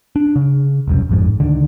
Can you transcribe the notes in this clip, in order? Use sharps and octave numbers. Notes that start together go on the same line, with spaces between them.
D4
C#3
E1 C2 F#2
A1 F2 G#2
C#2 D3 D#3